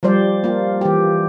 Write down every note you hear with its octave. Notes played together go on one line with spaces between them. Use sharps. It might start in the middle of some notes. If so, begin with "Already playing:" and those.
F3 G3 C5 D5
A#3 F4
E3 G4